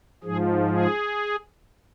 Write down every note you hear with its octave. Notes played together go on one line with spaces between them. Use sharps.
G#2 F3 G#4
G#4